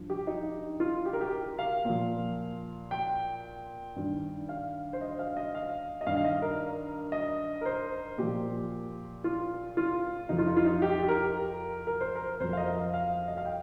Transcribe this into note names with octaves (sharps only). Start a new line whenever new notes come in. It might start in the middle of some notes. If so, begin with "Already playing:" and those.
Already playing: G2 F3
G4
D#4
F4
G4
A#4
G4
A#4
F5
A#2 F3
G5
G2 D#3
F5
C5
D#5
F5
D#5
F5
D#5
G2 D#3 F5
F5
D#5
A#4
D#5
A#4
C5
A#2 F3 G4
F4
F4
F2 F3 D#4
F4
D#4
F4
D#4
G4
G4
A#4
A#4
C5
A#4
F2 F3 C5
F5
D#5
F5
F5
D#5
F5
G5